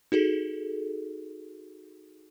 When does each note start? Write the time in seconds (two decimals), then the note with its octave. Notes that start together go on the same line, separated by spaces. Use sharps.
0.12 D#4 F#4 G#4 A4